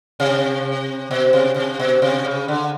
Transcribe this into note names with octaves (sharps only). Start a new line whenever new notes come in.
C3
B2
C3
C3
B2
C3
C#3
D3